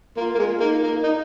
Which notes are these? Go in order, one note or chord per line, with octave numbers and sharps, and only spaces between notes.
A#3 F4
A#3
G#3
A#3 D#4
A#3
D#4